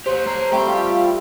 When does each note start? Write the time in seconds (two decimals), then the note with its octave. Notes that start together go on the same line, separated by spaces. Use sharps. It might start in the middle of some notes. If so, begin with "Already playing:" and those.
0.06 G4 C5 C#5
0.26 A3 A#5
0.52 G3 A3 C4 G4 G5
0.67 F4